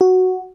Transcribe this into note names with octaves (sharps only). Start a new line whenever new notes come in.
F#4